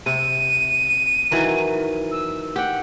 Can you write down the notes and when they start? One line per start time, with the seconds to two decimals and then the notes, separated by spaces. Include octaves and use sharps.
0.06 C3 D#7
1.31 D#3 E3 F#3
2.11 E6
2.56 G4 F#5 G5